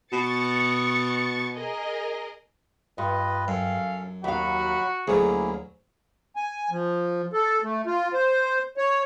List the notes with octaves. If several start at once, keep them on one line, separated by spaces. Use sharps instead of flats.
B2 C#6 A6 C#7
G#4 A#4 D#5
G2 F4 B4 D#5
F#2 C#4 A4 F5
D#2 F#3 F#4 F5 B5
D2 F#3 A#3 C#4 E4 G#4 A4
G#5
F3
A4
A3
F4
C5
C#5